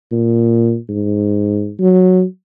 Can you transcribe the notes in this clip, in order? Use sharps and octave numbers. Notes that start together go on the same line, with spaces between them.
A#2
G#2
F#3